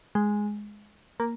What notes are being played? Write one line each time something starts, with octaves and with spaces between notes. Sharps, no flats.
G#3
A#3